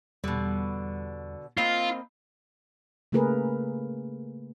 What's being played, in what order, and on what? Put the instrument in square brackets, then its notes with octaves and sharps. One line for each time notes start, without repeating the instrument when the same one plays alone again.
[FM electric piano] E2 G3 [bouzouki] B2 D3
[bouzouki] A#3 C4 D#5 [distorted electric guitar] F4 [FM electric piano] B5
[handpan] C#3 A3 A#3 G#4 A#4 B4